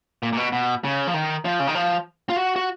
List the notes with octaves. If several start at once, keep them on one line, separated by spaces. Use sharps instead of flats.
A#2
A#2
B2
B2
C#3
F3
D#3
F3
C#3
D#3
F3
F4
F#4
F#4